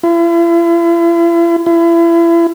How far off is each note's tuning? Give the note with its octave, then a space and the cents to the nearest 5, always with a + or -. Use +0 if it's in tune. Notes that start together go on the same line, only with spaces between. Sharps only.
E4 +45
E4 +35